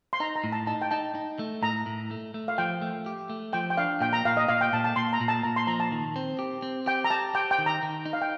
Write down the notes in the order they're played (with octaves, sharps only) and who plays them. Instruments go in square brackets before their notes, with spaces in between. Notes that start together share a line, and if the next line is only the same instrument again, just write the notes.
[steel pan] C6
[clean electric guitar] D#4 [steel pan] A#5
[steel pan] A#5
[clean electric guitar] A2
[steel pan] A5
[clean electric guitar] D#4 [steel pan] A5
[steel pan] G5
[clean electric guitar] D#4 [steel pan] A5
[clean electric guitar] D#4
A3
[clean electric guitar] A2 [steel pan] A#5
[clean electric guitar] A2
A3
A3
[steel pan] F5
[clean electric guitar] F3 [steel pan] G5
[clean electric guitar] A3
G4
A3
[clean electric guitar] F3 [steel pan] G5
[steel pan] G5
[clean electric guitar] D4 [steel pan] F5
[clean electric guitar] A#2 [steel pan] G5
[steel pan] A#5
[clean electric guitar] A#2 [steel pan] F5
[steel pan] D#5
[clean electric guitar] A#2 [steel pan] F5
[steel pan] G5
[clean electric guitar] A#2 [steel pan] A5
[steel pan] A5
[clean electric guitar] A#2 [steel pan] C6
[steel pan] A#5
[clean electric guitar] A#2
[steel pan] A5
[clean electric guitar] A#2 [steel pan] A#5
[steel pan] C6
[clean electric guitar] F3 [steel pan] A#5
[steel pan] A5
[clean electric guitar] D#3
C4
G4
C4
[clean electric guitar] G4 [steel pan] G5
[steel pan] A#5
[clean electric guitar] G4 [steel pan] A5
[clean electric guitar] G4 [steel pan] G5
[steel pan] G5
[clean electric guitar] D#3
[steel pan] A#5
[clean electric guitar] D#3
D#4
[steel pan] F5
G5